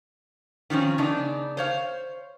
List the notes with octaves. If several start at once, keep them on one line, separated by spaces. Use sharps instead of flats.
D#3 F3 C4 C#4
C#3 B3 D4 D#4
C5 C#5 F5